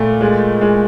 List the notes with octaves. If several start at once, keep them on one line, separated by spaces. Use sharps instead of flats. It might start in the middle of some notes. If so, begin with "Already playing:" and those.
Already playing: A#2 A3
G#3
G#3